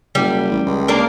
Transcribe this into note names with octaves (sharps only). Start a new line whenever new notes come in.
F#1 G3
A1
C#2
A#3 D4 A#4